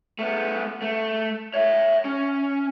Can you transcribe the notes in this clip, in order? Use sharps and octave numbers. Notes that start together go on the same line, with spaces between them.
A3 B3
A3
C#5 E5
C#4